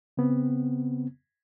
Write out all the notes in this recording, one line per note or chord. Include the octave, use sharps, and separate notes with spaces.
C#3 B3 C4